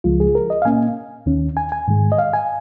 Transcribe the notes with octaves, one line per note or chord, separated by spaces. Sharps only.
C#2 C#3 F3 G#3 F4
G#4
A#4
D#5
F5
A#2 A#3 C#4 G#5
D#2 D#3 C#4
G#5
G#5
G#2 D#3 G#3
D#5
F5
G#5